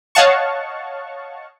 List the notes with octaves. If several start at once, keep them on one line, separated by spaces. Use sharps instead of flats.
C#5 D#5 F5 F#5 A5 C#6